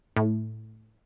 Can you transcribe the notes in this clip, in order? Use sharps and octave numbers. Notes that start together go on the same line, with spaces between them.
A2